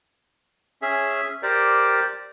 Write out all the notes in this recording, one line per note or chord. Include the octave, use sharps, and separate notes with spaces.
C#4 G#4 E5
G4 A#4 C5 D5